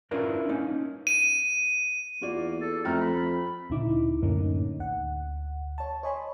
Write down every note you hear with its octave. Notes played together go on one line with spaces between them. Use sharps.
C#4 D4 E4 F4 A#4 B4
A#3 C#4 D#4
D#7
E2 A#3 F4 F#4 D5
A4
F2 A3 G5 A#5 F6
B5
D2 A#2 C#3 D#4 E4 D6
F#2 A2 D3 A#3 C#4 D#4
D2 F#5
C#5 A5
C#5 D#5 G#5 B5 C6